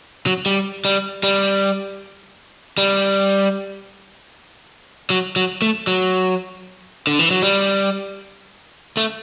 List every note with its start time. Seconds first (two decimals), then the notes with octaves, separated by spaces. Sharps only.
0.27 F#3
0.46 G3
0.85 G3
1.23 G3
2.78 G3
5.10 F#3
5.36 F#3
5.62 A3
5.87 F#3
7.07 D3
7.19 E3
7.31 F#3
7.42 G3
8.97 A3